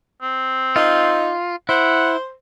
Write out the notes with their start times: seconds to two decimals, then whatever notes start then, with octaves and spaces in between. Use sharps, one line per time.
0.22 C4
0.76 D#4 F4
1.69 E4 C5 F#5